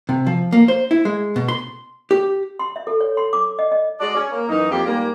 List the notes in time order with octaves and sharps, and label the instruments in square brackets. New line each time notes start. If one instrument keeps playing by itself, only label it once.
[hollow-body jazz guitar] C3
F3
A#3
C5
E4
G#3
B2
C6
G4
[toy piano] C6
E5
A4
C#5
C6
D6
D#5
D#5
[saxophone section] G#3 F#4 D5
C#4
A#3
F#2 E3 D#4
F2 F3 A#3 G4
G#2 G3 A#3